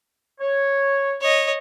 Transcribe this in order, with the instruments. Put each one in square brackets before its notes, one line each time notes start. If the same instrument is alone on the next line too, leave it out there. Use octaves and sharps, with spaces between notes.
[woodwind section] C#5
[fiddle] C#5 D#5